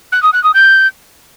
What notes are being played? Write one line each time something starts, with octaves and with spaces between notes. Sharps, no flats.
F#6
D#6
F#6
D#6
G6